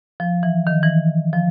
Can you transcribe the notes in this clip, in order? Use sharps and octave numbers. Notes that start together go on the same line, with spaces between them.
F3
E3
D#3
E3
F3